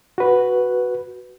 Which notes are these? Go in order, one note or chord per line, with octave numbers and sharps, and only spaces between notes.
F#4 B4